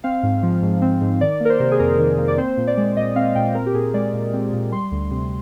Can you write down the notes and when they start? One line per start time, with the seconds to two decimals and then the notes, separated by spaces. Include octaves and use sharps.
0.04 C4 F5
0.23 G#2
0.43 F3
0.62 G#2
0.82 C4
1.01 G#2
1.21 D#3 D5
1.40 A#3 A#4
1.50 C5
1.60 C3
1.71 G#4
1.80 F2 A#4
1.99 D#3
2.18 A#3
2.28 D5
2.37 C4 C5
2.57 A#2
2.67 D5
2.77 G#3
2.96 A#2 D#5
3.16 C4 F5
3.35 A#2 G5
3.55 C4 A#4
3.66 G4
3.74 A#2 G#4
3.94 G#3 D5
4.13 A#2
4.33 C4
4.53 A#2
4.72 G3 C6
4.92 D2
5.11 C3